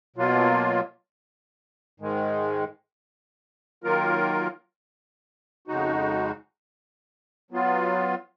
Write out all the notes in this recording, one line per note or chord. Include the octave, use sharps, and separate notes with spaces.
B2 F#3 A#3 F4
G#2 D#3 G#3
D#3 F#3 A#3 F4 A#4
F2 C#3 G#3 D#4 F#4
F#3 B3 F4